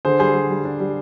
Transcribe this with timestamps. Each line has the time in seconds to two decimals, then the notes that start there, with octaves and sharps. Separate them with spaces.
0.05 D3 G#4 C5
0.20 G3 G#4 C5
0.34 G3
0.50 G3
0.65 D4
0.80 G3